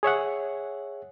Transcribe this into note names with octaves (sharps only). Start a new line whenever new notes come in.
G#4 C#5 E5 F#5